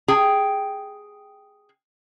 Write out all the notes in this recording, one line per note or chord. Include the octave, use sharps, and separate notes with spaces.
G#4 G5